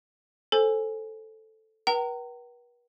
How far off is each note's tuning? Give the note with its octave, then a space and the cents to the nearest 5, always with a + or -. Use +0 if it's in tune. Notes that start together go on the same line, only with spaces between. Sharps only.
A4 +0 C5 +10 G#5 +0
B4 -45 G5 -45 A#5 -25